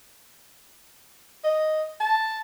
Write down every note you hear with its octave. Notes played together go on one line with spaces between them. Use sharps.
D#5
A5